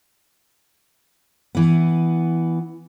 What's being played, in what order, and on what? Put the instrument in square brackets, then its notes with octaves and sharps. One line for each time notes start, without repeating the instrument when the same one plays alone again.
[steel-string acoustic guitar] E3 B3